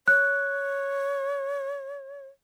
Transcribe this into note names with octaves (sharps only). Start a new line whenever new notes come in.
C#5 F#6